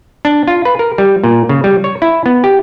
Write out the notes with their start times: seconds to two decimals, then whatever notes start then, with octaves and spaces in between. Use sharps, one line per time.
0.25 D4
0.48 F4
0.65 B4
0.79 A#4
0.98 G3
1.24 A#2
1.49 C#3
1.64 G3
1.84 C#5
2.02 E4
2.26 B3
2.44 G4